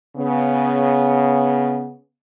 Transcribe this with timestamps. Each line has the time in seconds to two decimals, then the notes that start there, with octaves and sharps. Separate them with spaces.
0.16 C#3 B3